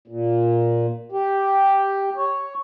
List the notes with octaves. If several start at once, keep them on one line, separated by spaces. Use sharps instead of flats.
A#2
G4
C#5